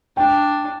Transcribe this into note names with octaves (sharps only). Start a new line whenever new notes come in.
D4 G5